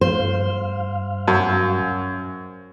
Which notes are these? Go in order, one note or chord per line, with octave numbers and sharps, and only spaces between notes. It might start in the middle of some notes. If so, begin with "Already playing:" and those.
G2 C5 F5
F#2